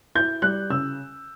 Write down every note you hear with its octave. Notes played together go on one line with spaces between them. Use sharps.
E4 G6
G3 F#6
C#3 E6